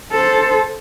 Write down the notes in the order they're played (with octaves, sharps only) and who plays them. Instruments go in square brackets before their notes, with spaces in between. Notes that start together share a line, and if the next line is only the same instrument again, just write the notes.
[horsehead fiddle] A4 C5